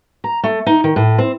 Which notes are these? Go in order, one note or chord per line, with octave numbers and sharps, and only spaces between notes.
A#5
A3
D#4
D#3
A2
C4